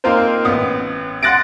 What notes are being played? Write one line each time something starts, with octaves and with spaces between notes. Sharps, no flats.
A#3 C4 D#4 F4 A#4 C5
A1 B3 D#6
F#5 C6 F#6 A6 A#6 D7